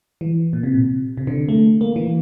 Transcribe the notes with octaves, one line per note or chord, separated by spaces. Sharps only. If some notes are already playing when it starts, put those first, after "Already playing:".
E3
A#2
C3
A#2
C3
D3
A3
A#3
E3